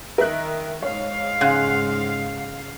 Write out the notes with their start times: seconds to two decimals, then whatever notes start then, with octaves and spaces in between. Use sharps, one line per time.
0.18 D#3 A#4 E5 F#6
0.82 G#2 C#5 F5
1.41 C#3 F#5 C6 F#6